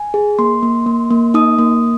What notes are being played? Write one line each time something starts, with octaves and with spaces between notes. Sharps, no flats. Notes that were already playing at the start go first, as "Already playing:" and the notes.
Already playing: G#5
G#4
A#3 C6
A#3
A#3
A#3
D#4 D#6
A#3